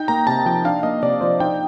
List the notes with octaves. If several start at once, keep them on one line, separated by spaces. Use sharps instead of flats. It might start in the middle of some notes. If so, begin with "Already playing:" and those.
Already playing: D#4 G5
A#3 A#5
C3 A5
F3 G5
D4 F5
A#3 D#5
C3 D5
F3 C5
D#4 G5